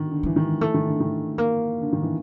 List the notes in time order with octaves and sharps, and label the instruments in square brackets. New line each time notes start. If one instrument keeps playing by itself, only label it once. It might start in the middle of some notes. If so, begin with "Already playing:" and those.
Already playing: [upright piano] D3 D#3
D3
[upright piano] E3 [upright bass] G#3
[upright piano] D#3
[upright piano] E3 [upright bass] A3
[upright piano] D#3
D3
D#3
[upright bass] A#3
[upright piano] D3
D#3
E3